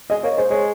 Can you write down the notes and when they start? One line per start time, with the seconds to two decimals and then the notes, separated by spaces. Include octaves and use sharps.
0.10 G#3 D#5
0.23 A#3 C#5
0.37 G#3 C5
0.50 G#3 C#5